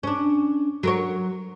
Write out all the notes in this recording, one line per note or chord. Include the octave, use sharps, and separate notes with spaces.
C#4 D4
F#3 A#4 C#5